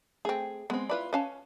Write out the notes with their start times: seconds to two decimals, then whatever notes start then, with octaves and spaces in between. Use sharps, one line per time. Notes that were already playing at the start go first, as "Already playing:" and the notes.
0.25 A3 C4 G#4
0.70 G#3 B3 C4
0.90 E4 F4 B4 D5 B5
1.13 C#4 B4 F5 G#5 A5